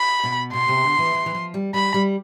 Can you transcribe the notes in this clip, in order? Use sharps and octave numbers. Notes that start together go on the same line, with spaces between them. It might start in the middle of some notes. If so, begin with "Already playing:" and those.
Already playing: B5
B2
B2 C6
C3
D3
E3
E3
E3
F3
G3
G3 B5
G3